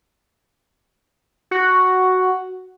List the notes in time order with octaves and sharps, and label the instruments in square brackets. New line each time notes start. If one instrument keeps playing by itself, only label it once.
[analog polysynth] F#4